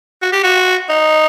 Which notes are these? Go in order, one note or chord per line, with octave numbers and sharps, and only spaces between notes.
F#4
G4
F#4
D#4